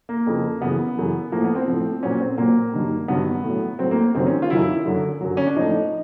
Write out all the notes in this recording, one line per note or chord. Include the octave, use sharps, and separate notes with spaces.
A#3
F2 C#3 F3
F#2 C#3 E3 B3
F#2 C#3 E3
A2 F3 A#3
B3
C4
A2 F3
A#2 F#3 C#4
C4
A#2 F#3 A#3
G2 D#3 F#3
G2 D#3 F#3 B3
A2 F#3
A2 F#3 C4
A#3
F#2 D#3 F#3 C4
C#4
F4
F#2 D#3 F#3 E4
E4
F#2 D3 F#3
F#2 D3 F#3
C#4
D4
A2 F3 D#4